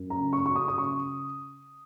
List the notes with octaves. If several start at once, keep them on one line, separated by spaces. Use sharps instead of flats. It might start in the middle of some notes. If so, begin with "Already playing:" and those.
Already playing: F#2
A#5
C#3
C#6
F#3 C#6
D#6
D#6
C#3 C#6